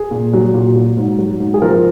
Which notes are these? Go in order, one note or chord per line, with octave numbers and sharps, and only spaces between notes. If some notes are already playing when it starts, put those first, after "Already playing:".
Already playing: G#4
A#2
F#3
A#2
F#3
G#2
F#3
G#2
G#4
F3 A#4